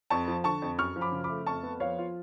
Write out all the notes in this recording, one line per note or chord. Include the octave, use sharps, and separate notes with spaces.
F2 A5 C#6
F3
D3 A5 C#6
F2
F#2 C#6 F6
F3
B5 D6
C#3
B5 D6
A3
F2 A5 C#6
B3
F3 C#5 F5
F4